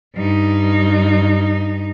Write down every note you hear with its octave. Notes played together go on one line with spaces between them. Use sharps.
G2 D#4